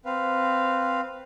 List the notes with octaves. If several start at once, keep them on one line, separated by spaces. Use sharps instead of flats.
C4 B4 F5